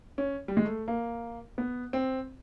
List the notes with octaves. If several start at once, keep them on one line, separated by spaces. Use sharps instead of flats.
C#4
G3
G#3
A3
A#3
B3
C4